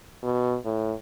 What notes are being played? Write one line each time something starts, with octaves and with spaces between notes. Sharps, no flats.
B2
A2